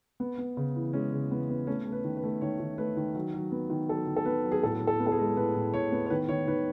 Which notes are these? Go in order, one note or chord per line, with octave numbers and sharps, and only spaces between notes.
B3
B3
C#3
E3
G#3 C#4
C#3
E3 B3
B3
A3 C#4
A3
B4
D#3
B4
A3
D#3 C#5
D#3
A3 B4
D#3
F#3
F#3
B3
D#3
F#3 A4
D#3
A4
B3 B4
F#3
G#4
A2 A4
A2
A4
B3
A4
G#4
G#3
A2 B4
A2
A2 C#5
B3
C#5
D#3 B4
D#3 C#5
D#3 B4